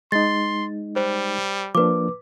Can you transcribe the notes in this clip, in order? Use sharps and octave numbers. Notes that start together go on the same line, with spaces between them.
G#3 D#4 C6 A6
G3 C5
F3 A#3 D4 B4 D6